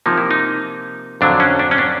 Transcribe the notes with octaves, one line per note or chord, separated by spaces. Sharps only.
C3 F3 A#3 D#4
E4
D#4
F2 D3 F#3 D4
C#4
D4
C#4
D4